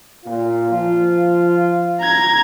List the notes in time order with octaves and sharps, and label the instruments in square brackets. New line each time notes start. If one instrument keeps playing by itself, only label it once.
[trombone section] A#2 F4
F3 F4
[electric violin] A#5 G#6